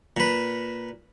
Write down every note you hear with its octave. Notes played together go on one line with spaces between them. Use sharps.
A#2 B4